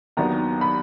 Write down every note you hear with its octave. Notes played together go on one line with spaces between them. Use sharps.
D#2 D#3 F#3 B3 D4 A#5
B5